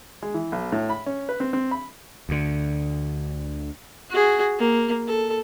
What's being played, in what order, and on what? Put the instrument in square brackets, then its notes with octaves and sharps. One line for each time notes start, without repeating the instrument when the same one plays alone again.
[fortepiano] G#3
E3
B1
A2
B5
C#4
B4
C4
C4
B5
[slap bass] D2 D3
[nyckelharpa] F#4 G#4
A#3
A4